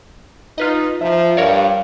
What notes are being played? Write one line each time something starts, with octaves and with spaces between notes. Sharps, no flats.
D#4 F4 B4 D#5
F3 E5 A#5
G2 A#4 C#5 D5 F5